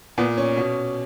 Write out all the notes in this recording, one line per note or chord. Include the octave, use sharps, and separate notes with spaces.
A#2 B3
C#4
B2